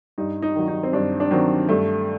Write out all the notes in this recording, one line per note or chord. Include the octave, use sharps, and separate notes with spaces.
G2 D#4
D#4
D#3 F#3
D#4
C4
G2 D4
D4
D#3 F#3 C4
G2 A3